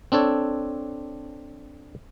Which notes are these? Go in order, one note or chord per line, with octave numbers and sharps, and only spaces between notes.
C4 D4 A4 C#5